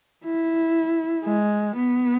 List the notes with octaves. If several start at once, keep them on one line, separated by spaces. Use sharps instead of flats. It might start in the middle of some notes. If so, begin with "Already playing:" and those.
E4
G#3
B3